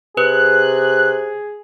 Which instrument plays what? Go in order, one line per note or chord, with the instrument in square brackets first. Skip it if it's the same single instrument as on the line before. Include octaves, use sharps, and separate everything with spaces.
[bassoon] C3 [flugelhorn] G#4 [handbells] B4 [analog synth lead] F#6